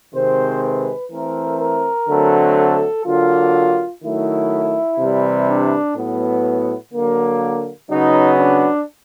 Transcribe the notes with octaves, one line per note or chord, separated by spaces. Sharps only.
C3 D#3 G#3 C4 C5
B4
E3 A3 C4 A#4
A#4
D3 F#3 A3 C4
A4
D3 F#3 A#3 F4
D#3 F#3 A3 E4
C3 E3 G3
D4
A2 F#3 B3
D3 F#3 A#3
C#3 F#3 B3 D#4
D4